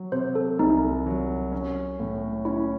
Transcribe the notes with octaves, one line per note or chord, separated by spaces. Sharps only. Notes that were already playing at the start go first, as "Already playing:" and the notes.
Already playing: F#3
C3 C5
A4
C2 D#4
F#3
C#4
A2
C#4 E4